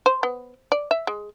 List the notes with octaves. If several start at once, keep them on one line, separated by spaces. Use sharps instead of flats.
C5
B3
D5
E5
G#3